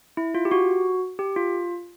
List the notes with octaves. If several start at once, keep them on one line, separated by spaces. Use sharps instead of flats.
E4
F4
G4
F#4
G4
F4